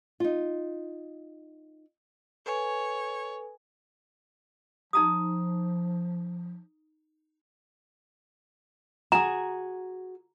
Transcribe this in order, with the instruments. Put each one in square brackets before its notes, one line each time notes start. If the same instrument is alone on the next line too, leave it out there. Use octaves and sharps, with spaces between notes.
[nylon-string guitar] D#4 F4
[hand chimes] A4 B4 G#5 [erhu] C#5
[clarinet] F3 [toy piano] D#4 A#5 D#6
[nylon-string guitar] F#4 G#4 [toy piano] A#5